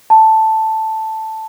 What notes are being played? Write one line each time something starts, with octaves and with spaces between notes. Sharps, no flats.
A5